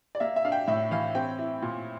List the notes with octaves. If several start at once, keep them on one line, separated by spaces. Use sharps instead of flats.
D5
A#3 E5
E5
D4 F5
G5
A2 E5
E3 F5
C4 G5
E4
A#2